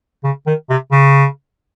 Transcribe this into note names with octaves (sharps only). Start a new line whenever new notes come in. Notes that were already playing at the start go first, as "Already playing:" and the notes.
C#3
D#3
C3
C#3